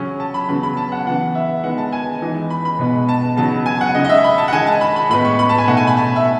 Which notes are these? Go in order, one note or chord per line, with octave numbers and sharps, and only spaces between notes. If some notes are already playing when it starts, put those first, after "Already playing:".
Already playing: C#3 F#3 C#4
A5
B5
C#3 F#3 B3 B5
B5
A5
F#5
C#3 E3 B3 F#5
E5
D#3 G#3 B3 F#5
A5
G#5
E3 G#3 B3 D#4
B5
B5
B2 G#3 B3
A5
C#3 F#3 B3 D#4 A5
G#5
F#5
C#3 G#3 D#4 D#5
D#5
E5
B5
A5
F#5
D#3 G#3 D#4 G#5
A5
B5
B5
A2 G#3 B3 B5
C#6
B5
A5
G#5
B2 A3 D#4 F#5
G#5
B5
A5
E5